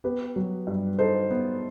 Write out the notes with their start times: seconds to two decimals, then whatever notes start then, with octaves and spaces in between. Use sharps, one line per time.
0.04 B3 G4 B4
0.36 F#3
0.67 G2
0.98 D#4 A4 C5
1.30 B3